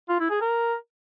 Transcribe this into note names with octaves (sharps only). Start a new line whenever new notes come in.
F4
E4
G#4
A#4